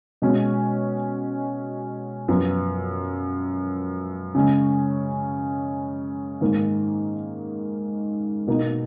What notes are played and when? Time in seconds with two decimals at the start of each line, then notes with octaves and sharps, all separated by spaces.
0.22 B2 G#3 C#4 F#4
2.28 F#2 F3 B3
4.35 C#3 G#3 C#4
6.41 G#2 D#3 A#3
8.47 B2 A#3 D#4